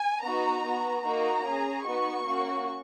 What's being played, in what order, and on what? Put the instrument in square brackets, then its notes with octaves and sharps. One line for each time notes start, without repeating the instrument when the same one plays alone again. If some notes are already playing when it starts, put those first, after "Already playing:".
Already playing: [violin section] G#5
B3 D#4 F#4 A#5
B3 F#4
A#3 D#4 F#4 A#5
C#4 G#4
B3 D#4 F#4 C#6
A#3 C#4 F#4